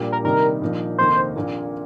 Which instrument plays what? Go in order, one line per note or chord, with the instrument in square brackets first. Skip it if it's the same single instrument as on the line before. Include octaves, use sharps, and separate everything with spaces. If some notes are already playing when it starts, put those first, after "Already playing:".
Already playing: [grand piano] A#1 A#2 G3 A#3 G4
[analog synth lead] A#4
[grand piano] C3 D#3 G3 D#4 [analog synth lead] A#4
[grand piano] A#1 A#2 F3 A#3 D#4
[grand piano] F1 D#2 D#3 A#3 D#4 [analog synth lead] C5
[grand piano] A#1 A#2 A#3 F4